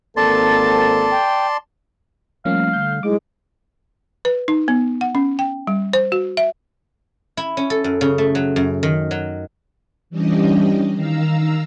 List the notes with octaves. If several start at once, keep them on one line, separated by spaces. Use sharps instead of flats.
G#1 A#3 C4 A4 D5 A5 C6 A6
G5
F3 G3 A3 A#3 C#4 F5
D3 G6
F#3 G#3 D#4 E4 D6
B4
D#4
B3
F#5
C#4
G5
G3
C5
F#4
E5
E4
C#4
A4
F#2
C#3
A3
F#3
F#2
D#3
F#3
E3 G3 C#4 D4 G4 D#5
D#3 F5 A#5 E6